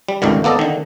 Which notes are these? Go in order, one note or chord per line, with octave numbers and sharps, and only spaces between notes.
G3
G#1 C#2 G2 D3 D#3
A#3 B3 A4 D5 D#5
D3 D#3